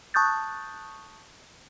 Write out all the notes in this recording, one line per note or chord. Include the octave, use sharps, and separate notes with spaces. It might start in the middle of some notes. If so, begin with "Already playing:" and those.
A5 C#6 D#6 F#6 G6 A6